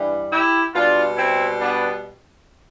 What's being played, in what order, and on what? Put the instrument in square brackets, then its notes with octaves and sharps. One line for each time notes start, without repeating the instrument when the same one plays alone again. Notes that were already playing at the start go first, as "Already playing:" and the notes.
Already playing: [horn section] G2 E3 G3
E4 G4
B2 G3 D4 F4
C4 E4
B3 D4